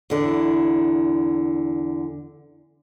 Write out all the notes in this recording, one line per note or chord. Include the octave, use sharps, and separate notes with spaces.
E2 D3 E4